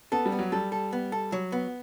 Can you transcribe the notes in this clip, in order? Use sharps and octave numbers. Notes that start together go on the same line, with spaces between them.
B3 A4
G3
B3
F#3
G3 A4
A4
B3
A4
F#3
B3